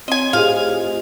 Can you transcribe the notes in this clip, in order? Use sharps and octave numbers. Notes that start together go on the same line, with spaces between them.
C4 C#5 D#5 G#5
A2 F4 G4 G#4 C5 D#5 F5